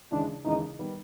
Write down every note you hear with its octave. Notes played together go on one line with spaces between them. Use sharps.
D#2 C#3 E3 G#3 D4
D#2 C#3 E3 G#3 D#4
D#3 G3 B3